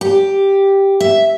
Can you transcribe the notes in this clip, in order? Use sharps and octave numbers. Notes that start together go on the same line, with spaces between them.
G4
E5